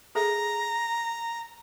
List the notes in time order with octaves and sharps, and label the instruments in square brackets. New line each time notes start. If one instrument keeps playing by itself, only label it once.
[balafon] G#4 A4 E5 [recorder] A#5